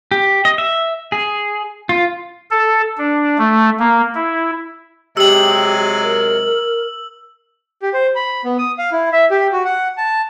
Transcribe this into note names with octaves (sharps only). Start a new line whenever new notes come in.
G4
D#5
E5
G#4
F4
A4
D4
A3
A#3
E4
C3 F#3 G#3 G4 E6 F#7
A#4
G4
C5
B5
B3
D#6
F5
E4
E5
G4
F#4
F#5
A5